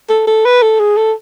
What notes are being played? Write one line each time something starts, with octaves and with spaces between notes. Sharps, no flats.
A4
A4
B4
A4
G#4
A4